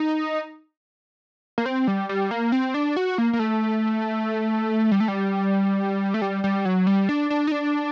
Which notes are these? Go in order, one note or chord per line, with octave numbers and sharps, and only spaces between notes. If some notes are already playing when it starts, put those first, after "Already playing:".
Already playing: D#4
A#3
C4
G3
G3
A#3
C4
D4
F#4
A#3
A#3
A3
G3
A3
G3
A3
G3
G3
F#3
G3
D4
D4
D#4
D4